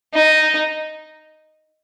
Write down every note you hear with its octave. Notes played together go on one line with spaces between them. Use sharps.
D#4